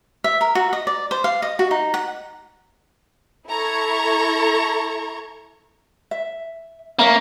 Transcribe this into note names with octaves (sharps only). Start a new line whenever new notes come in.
E5
A#4
F#4
D#5
D5
C5
F5
D#5
F#4
D#4
F#5
E4 A4 A#5 C#6 G#6
E5
A#3 C#4 E5 A#5